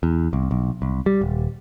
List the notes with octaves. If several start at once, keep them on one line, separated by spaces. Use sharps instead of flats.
E2
C2
B1
C2
G3
D#1